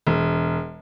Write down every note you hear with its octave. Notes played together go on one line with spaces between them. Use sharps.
E1